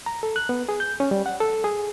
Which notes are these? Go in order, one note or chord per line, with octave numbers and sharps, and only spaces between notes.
A#5
A4
F#6
B3
G#4
G6
C#4
G3
F#5
A4
G#4